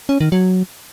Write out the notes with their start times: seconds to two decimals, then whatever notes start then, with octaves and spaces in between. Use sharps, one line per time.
0.09 C#4
0.21 D#3
0.32 F#3